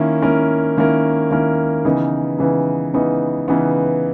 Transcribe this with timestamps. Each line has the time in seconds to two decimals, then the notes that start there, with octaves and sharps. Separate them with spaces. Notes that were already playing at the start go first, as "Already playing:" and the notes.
Already playing: D#3 A#3 C#4 E4 A#4
0.22 D#3 A#3 C#4 E4 A#4
0.77 D#3 A#3 C#4 E4 A#4
1.31 D#3 A#3 C#4 E4 A#4
1.85 C#3 E3 B3 D#4
2.38 C#3 E3 B3 D#4
2.94 C#3 E3 B3 D#4
3.48 C#3 E3 B3 D#4